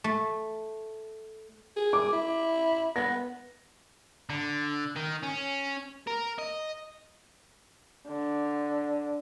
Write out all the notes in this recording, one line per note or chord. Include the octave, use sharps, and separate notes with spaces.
A3
G#4
D6
E4
B3 A#6
D3
D#3
C#4
A#4
D#5
D3